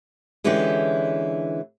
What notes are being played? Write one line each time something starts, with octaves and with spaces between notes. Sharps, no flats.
D3 E3 G#3 B3 C#4 G4